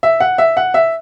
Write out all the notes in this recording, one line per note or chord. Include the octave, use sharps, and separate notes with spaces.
E5
F#5
E5
F#5
E5